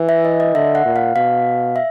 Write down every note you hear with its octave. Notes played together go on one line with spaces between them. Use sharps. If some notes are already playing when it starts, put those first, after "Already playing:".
Already playing: E3
E5
D#5
D#5
D3 E5
F#5
A#2
F5
B2 F5
E5